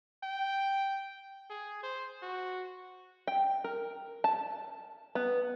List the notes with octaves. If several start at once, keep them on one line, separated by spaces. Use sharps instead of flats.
G5
G#4
C5
F#4
G5
A#4
A5
B3